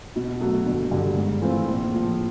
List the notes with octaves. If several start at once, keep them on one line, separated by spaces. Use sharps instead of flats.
B2
F#3 A3 D4 F#4
G1
G2 D3
G#2
E3 A3 C4 F4
A#1
A2 F3